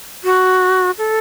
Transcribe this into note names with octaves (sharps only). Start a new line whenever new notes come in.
F#4
A4